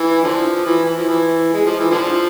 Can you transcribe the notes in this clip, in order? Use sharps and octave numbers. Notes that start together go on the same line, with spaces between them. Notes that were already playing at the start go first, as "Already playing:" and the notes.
Already playing: E3
D3 F3
E3
E3
F3
E3
G#3
F3
E3
D3 F3